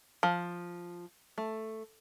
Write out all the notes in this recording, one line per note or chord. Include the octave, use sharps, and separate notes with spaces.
F3
A3